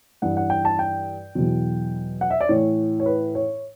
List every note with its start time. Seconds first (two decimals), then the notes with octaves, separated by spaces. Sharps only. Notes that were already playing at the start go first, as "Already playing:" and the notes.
0.22 G2 E3 F#5
0.37 F#5
0.50 G5
0.65 A5
0.79 G5
1.35 E2 B2 F#3
2.21 F#5
2.30 E5
2.41 D5
2.49 A2 E3 C#5
3.00 C#5
3.06 B4
3.35 C#5